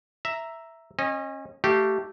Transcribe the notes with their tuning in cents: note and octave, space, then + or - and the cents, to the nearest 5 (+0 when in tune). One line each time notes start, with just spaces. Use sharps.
E5 +0 A#5 +0
C#4 -35 D#5 +0
A3 +0 G4 -15 F5 +0